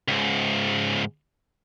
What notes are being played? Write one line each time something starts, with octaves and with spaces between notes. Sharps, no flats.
C#2 G#2